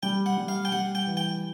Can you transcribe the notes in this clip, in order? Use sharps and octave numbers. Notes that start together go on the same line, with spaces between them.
G3 G5
F#5
G3
F5
G5
G3 F#5
G5
E3
G5